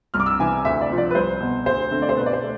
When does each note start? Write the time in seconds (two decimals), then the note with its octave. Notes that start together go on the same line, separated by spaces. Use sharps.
0.14 C2 F6
0.20 D6
0.26 E6
0.39 C3 E3 G#5
0.65 D2 E5
0.81 D5
0.90 C3 F3
0.98 D5
1.10 B4
1.15 C2 C5
1.40 B2 B3
1.66 D2 C5
1.91 D3 A3 C4
2.02 D5
2.09 C5
2.17 B2 B4
2.26 D5
2.33 C5
2.42 A3